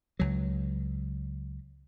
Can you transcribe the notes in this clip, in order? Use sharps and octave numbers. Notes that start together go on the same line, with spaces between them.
C#2 F#3